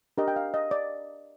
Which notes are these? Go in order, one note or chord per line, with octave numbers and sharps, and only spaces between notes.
D4 G4 A#4 D#5
G5
F5
D#5
D5